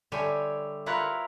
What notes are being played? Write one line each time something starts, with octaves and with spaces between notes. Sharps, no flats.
D3 G3 C#5 E5 G5 G#5
E4 F4 A#4 B4 C#5 F#5